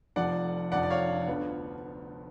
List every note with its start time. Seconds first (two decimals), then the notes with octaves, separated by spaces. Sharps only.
0.16 F1 F2 F3 D5 F#5
0.72 F1 F2 F3 D5 F#5
0.83 D5
0.90 C#5 F5
1.28 D2 D3 F3 B3